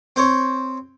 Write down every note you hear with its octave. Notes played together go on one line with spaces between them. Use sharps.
C4 C5 C#5